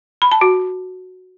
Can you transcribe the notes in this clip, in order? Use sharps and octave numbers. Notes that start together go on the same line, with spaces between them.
B5
A5
F#4